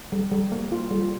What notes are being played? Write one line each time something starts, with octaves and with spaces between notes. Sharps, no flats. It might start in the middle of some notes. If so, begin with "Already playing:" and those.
G3
G3
A#3
F4
G3